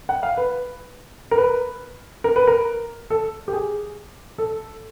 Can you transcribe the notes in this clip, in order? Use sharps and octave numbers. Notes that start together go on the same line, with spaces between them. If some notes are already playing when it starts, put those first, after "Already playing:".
F#5
F5
B4
A#4
B4
A#4
B4
A#4
A4
G4
G#4
A4